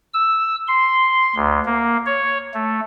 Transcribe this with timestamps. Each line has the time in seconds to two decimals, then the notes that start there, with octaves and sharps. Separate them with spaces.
0.14 E6
0.68 C6
1.36 D2
1.65 A#3
2.06 C#5
2.54 A3